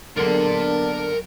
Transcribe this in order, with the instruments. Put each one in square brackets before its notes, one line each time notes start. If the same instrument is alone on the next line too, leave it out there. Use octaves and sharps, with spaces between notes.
[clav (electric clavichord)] D3 A#3 [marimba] F#3 G#4 [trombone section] B3 D4 [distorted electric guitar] A#4 C6